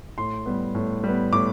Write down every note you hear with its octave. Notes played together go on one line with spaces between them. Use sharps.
A2 C6
G3 B3
A2
G3 B3
A2 D6